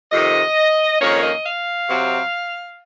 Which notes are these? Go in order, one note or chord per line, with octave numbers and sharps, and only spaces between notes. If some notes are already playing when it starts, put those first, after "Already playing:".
F2 C3 D#3 D#5
F2 D#3 A#3 C#4 C#5
D#5
F5
C3 F#3 C4